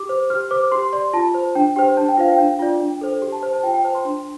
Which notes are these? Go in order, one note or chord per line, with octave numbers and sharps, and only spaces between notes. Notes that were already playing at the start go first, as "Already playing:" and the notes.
Already playing: G4 D6
C5
G4 F6
C5 D6
G4 C6
D5 C6
F4 A5
C5
D4 G5
G4 C5 G5
D4 A5
G5
F4 C5 F5
G5
D4
F4 D5
D4
A4 C5
G4
A5
C5 A5
A5
F4 G5
G5
C5 A5
C6
D4